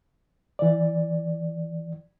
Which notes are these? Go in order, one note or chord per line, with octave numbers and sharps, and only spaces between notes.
E3 D5